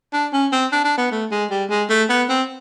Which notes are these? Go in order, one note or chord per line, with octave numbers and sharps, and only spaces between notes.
D4
C#4
C4
D4
D4
B3
A3
G#3
G3
G#3
A3
B3
C4